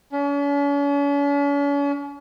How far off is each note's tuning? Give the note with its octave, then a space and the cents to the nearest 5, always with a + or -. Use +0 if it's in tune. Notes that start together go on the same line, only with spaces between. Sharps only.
C#4 +45